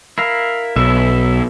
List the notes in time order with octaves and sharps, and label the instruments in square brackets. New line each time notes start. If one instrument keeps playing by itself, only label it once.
[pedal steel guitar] E4 A#4 F5
[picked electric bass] B1 [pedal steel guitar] E4 E5